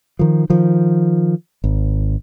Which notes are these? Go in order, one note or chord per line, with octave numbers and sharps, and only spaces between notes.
D#3 F3
D#3 F3
G#1